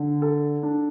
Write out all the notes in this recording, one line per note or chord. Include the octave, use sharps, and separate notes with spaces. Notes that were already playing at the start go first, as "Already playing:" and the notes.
Already playing: D3
A4
D4